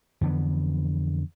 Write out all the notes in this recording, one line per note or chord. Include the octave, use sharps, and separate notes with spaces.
F2 D3 E3 B3